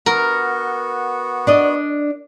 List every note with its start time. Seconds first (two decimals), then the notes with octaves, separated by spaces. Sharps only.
0.06 B3 F#4 A#4
1.47 D4 D5 D#5